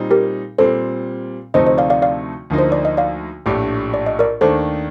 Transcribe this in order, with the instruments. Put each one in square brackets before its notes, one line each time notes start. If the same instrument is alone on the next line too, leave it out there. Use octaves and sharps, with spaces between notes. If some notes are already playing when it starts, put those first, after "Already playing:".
Already playing: [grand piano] A#2 G3 C4 D#4
[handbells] G4 A#4
[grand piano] A#2 G3 C4 [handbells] A4 C5
[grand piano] D2 C3 F3 A3 D#4 [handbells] C5 D#5
[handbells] C5 D#5
D5 F5
D5 F5
D5 F5
[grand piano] D2 D3 F3 A#3 D#4
[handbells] C5
D5
D#5
D5 F5
[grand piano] A#1 A2 A3 D4 G4
[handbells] D5
D#5
A#4 D5
[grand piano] D#2 D#3 A3 D4 [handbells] A4 C5